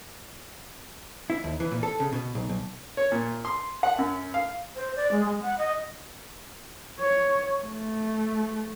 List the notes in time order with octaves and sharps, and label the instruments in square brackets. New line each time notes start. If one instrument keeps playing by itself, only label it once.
[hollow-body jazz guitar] E4
D#2
E3
A#2
A4
C#3
B2
B1
B1
[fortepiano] C#5
A#2
C6
F#5
F#2
F5
[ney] C5
D5
G#3
G#3
F#5
D#5
[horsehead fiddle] C#5
A3